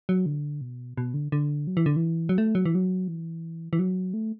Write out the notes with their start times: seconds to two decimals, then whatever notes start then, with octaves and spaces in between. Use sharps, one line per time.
0.09 F#3
0.26 D3
0.61 B2
0.98 B2
1.14 D3
1.32 D3
1.67 F#3
1.77 E3
1.86 D3
1.96 E3
2.29 F#3
2.38 A3
2.55 F#3
2.65 E3
2.75 F#3
3.08 E3
3.73 E3
3.79 F#3
4.14 A3